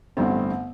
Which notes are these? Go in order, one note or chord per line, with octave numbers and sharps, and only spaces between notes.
A1 G2 D3 A3 B3 C4